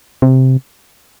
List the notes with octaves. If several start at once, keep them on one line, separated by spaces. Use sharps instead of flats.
C3